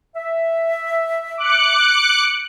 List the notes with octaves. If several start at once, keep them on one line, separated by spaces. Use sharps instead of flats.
E5
D6 F#6 C#7